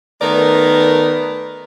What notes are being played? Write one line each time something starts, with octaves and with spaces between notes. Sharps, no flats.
D#3 A3 B3 A#4 B4 D5